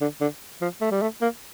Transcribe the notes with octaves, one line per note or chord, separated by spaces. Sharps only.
D3
D3
F3
A3
G3
A3
A#3